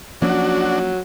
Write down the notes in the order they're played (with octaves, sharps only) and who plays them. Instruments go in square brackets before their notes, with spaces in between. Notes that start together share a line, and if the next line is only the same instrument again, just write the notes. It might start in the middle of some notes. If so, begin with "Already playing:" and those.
[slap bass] F3 A#3 C#4 [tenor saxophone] F#3 [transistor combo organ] D4 F#4